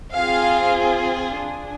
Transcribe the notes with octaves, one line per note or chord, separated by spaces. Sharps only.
C4 F4 G#4 F5
D4 G#4